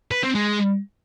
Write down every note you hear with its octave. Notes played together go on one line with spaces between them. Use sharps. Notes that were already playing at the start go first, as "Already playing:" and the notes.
B4
C4
G#3